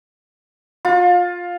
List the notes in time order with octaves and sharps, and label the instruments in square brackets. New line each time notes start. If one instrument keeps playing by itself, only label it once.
[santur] F4